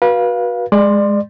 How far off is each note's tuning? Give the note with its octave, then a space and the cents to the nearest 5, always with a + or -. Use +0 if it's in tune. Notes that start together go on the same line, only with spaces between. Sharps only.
F#4 +0 B4 -30 F5 +0
G#3 +0 D5 +25 C6 +0